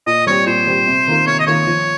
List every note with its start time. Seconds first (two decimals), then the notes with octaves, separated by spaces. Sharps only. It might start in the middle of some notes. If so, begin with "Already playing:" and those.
0.07 A#2 D#5
0.27 G3 C4 G4 C#5
0.47 A#2 C5
0.67 G3 C4 G4
0.87 C3
1.07 D#3 A#3 F4 A#4
1.27 C3 C#5
1.40 D#5
1.47 D#3 A#3 F4 A#4 C#5
1.67 F3